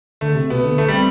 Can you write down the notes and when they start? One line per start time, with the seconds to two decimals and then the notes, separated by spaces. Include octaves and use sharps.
0.21 D3 A3
0.35 C3
0.50 B2 B3
0.64 D3
0.78 A3
0.88 G3
0.93 C4